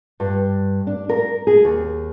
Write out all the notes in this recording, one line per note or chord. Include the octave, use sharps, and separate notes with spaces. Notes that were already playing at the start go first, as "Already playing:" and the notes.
G2
D4
A#4
G#4
D#2